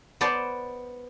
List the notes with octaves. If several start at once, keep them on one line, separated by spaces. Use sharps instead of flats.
B3 C5 D5 A5